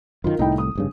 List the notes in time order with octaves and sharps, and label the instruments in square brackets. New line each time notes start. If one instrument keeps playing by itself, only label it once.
[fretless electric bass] F#2 D#3 [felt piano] F4 A#4
[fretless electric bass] C2 A2 [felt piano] D#4 E4 G5
[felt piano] D#6
[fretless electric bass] F1 G2 C#3